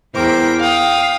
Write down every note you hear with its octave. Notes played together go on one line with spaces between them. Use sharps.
E2 E4 A#4 C5 G5 D6
F5 G5 D#6